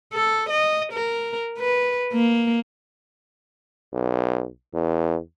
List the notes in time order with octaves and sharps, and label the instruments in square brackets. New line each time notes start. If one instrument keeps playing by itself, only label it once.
[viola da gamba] A4
D#5
A#4
B4
A#3
[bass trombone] B1
E2